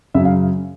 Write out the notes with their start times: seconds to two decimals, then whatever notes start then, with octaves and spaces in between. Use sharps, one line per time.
0.14 F#2 C#3 F#3 E5
0.25 F5